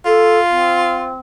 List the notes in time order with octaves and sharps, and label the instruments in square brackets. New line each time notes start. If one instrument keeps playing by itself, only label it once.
[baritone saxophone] F4 [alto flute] A4
[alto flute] C4